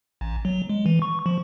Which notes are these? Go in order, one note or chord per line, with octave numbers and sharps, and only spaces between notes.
A1
F#3
G#3
E3
C#6
F3